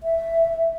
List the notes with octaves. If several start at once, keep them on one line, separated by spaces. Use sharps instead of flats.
E5